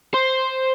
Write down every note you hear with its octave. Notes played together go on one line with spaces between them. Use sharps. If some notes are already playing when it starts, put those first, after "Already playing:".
C5